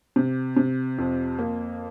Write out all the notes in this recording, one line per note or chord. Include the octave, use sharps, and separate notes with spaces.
C3
C3
F2
A#3